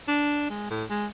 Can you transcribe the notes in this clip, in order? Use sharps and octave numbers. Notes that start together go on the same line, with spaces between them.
D4
G#3
A2
G#3